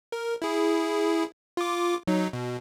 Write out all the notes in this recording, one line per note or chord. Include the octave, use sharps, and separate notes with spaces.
A#4
E4 G#4
F4 D6
F#3 D#4
B2